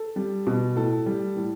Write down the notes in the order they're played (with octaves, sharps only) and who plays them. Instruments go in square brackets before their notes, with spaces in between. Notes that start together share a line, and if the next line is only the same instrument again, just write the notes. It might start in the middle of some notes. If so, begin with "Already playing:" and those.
Already playing: [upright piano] A4
G3
B2
A2 A4
G3
A2